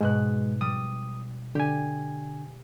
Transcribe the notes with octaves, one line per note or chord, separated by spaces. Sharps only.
G#2 B2 G#3 F#6
G3 D#6
D3 G4 G#5